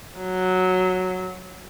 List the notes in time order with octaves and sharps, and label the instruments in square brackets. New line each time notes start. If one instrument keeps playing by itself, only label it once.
[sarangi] F#3